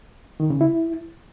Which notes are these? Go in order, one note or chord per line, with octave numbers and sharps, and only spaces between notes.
D#3
C#3
E4